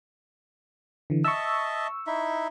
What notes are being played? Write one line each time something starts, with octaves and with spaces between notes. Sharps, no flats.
D3 E3
D#5 E5 A5 C#6 E6
D#4 E4 E5